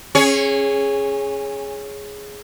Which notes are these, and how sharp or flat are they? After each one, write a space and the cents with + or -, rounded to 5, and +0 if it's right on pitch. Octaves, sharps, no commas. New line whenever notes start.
C#4 -25 G#4 +0 C#5 +0